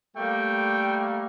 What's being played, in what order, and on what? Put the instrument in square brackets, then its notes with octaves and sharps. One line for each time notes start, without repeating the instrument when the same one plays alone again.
[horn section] G3 A3 A#3 [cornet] G5